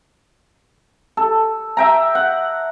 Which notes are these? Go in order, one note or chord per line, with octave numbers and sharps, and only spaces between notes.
A4
E5 G5 A#5
F#5